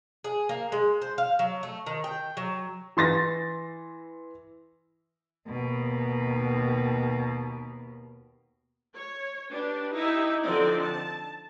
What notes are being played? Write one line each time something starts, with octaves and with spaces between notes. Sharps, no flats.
G#4
A#3
G#3
C5
F5
F#3
A3
D#3
G5
F#3
E3 C6 A6 A#6
D#2 B2
C#5
D4 G4 B4
D#4 E4 G4 E5
D3 F3 C4 D#4 C5 D5
A5